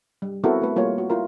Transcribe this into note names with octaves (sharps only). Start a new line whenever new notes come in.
G3
B3 C4 E4 F#4 A4 A#4
A3 B4
G3 A#3 F4 B4 C#5
F#4
E4 F4 A#4